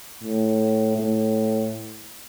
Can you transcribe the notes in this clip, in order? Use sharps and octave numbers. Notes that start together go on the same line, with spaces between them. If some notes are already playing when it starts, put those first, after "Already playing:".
A2
A2